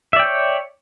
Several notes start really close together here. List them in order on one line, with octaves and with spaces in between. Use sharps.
E5 D5 G5 C#5